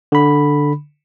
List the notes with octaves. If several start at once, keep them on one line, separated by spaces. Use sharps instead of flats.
D3 B5